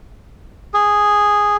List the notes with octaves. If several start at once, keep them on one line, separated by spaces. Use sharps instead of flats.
G#4